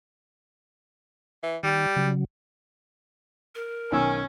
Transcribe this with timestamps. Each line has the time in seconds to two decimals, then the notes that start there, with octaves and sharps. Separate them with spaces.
1.43 E3
1.63 D#3 G3
1.96 C#3 F#3
3.55 A#4
3.92 B1 D#3 C#4 G#5 E6